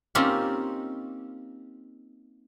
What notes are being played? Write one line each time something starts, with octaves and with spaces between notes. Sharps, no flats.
A#3 C4 C#4 D#4 F4 G4